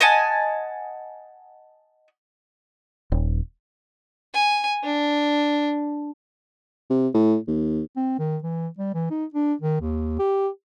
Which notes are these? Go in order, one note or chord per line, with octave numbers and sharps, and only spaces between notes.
D#5 F#5 G#5 A5
D#1
G#5
D4
C3
A2
D#2
C4
D#3
E3
G3
E3
D#4
D4
D#3
D#2
G4